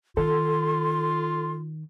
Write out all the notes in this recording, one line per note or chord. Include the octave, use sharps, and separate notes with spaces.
D#3 F4 A4 C6